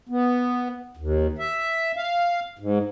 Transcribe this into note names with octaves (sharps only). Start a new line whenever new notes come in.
B3
D#2
E5
F5
G#2